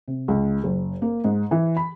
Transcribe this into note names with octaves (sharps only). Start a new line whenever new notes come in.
C3
C#2
F#1
A#3
G#2
E3
B5